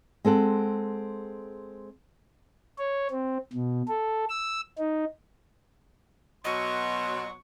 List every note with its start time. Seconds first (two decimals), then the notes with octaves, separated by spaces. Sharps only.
0.25 G#3 C4 A4 F#5
2.78 C#5
3.11 C4
3.53 B2
3.88 A4
4.29 E6
4.78 D#4
6.45 B2 F#3 D#5 C6 C#6